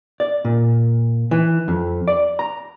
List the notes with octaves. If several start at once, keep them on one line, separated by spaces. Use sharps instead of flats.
D5
A#2
E3
F2
D5
A#5